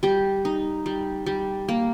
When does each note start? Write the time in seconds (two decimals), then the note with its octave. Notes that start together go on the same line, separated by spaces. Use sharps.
0.03 G3 G4
0.45 D#4
0.86 G3
1.26 G3
1.68 A#3